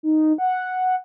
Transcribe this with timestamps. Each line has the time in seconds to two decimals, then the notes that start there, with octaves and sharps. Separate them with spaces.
0.03 D#4
0.38 F#5